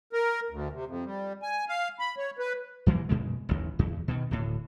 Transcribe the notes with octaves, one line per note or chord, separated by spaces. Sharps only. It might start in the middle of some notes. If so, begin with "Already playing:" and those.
A#4
D2
C3
F2
G3
G#5
F5
B5
C#5
B4
D#2 E3 F#3 A#3
F#2 B2 G#3
A1 D#2
E2
B2 D#3
D1 A2